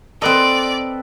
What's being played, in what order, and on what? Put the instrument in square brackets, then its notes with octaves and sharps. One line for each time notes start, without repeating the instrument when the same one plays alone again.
[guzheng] C4 D#5 [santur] A4 B4 [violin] D5